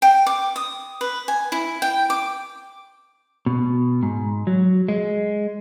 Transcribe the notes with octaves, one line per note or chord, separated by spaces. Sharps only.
G5
D6
D#6
B4
G#5
E4
G5
D6
B2
G#2
F#3
G#3